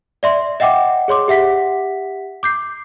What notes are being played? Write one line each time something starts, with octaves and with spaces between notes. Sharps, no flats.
D5 E5 C6
D#5 E5 F#5 G5 D6
G#4 C#5 C6 D6
G4 E5 F#5 B6
D6 G6 C7